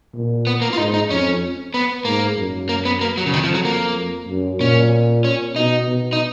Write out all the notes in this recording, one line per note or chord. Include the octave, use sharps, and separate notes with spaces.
A#2
B3
A#3
F4
G#2 D#4
D#4
F2 C#4
B3
G#2 A#3
F#2
A#3
B3
A#3
F#3
C#3
F2 D#3
F3
F#3
A#3
F#2
A#2 C#4
C#4
B2 D#4
B2
D#4